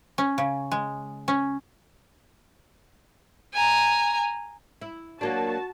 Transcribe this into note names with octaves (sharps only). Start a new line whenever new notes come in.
C#4
C#3
G#3
C#4
G#5 A#5
E4
F#3 A#3 D4 F#4 A5